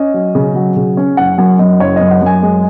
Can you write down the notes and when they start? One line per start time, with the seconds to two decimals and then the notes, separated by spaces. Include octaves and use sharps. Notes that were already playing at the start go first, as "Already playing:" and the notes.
Already playing: C#4 D#5
0.14 F#3
0.35 C#3
0.55 F#3
0.76 C#3
0.97 C#4
1.17 F#1 F#5
1.38 F#2 F#5
1.59 F#2 D#5
1.80 F#1 C#5
1.96 F#2 D#5
2.11 F#5
2.21 F#2 G#5
2.43 G#3